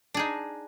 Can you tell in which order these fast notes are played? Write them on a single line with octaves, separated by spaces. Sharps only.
D4 G#4 D#4